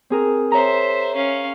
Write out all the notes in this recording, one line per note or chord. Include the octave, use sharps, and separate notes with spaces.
C4 G#4 A#4
C5 C#5 E5 A#5
C#4 F5